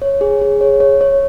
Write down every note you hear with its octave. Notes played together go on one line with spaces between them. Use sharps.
C#5
G#4
G#4
C#5
C#5
C#5